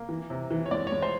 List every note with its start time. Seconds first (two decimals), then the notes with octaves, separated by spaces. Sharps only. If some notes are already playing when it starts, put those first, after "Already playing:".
Already playing: A#3
0.09 E3
0.30 C3
0.51 E3
0.66 C#5
0.71 G#3 D5
0.87 G#3 C#5
1.02 C5